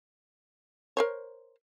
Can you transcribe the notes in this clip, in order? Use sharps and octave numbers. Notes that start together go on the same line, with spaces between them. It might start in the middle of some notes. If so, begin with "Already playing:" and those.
A#4 C5 C#5